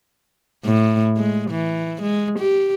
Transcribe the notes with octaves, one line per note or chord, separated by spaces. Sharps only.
A2
G#3
E3
G#3
G4